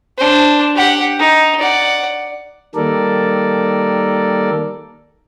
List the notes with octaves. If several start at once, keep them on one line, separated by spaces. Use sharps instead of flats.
D4 C5
G4 F#5
D#4
D5 F#5
D#3 G3 A#3 A4 A#4 D5